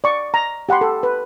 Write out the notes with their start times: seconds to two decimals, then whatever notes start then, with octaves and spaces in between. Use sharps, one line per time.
0.04 D5 C#6
0.34 A#5
0.69 G4 F#5 B5 C6
0.81 A4
1.03 B4